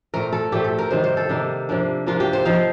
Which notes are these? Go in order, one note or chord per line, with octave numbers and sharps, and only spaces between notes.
A#2 A3 C4 A#4
A4
A#2 A3 C4 G4
A4
A#4
C3 D#3 G3 A#3 C5
C5
A4
C3 D#3 G3 A#3
C3 F3 A#3 D4
C3 F3 A#3 D4 F4
G4
C5
F3 C4 D#4 F5